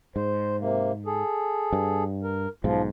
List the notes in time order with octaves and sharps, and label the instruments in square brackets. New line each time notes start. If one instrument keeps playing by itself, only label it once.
[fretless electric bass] G#2 [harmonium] C5
[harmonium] C3 A#3
G#4 A4
[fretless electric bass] G2
[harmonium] A#4
[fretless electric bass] B1 G#2 [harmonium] F3 F4